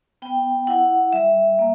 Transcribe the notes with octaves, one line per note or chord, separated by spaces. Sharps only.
B3 G5
E4 F#5
G3 E5
A#3